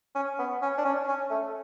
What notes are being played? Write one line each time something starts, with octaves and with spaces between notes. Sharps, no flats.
C#4
B3
C#4
D4
C#4
C#4
A3